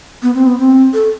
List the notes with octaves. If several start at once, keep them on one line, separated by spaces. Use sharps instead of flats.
B3
C4
B3
C4
A4